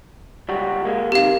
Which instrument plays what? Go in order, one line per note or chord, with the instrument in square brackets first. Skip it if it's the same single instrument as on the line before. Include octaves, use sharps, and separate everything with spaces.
[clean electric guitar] C#2 G3 F#4
G#3 A#3
[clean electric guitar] C3 D#3 [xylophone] G4 F5